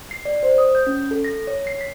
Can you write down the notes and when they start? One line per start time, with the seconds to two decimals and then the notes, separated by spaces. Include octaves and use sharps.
0.11 C7
0.25 D5
0.43 C5
0.58 D#6
0.75 G6
0.87 C#4
1.11 A4
1.24 A#6
1.47 C#5
1.67 C7
1.81 B6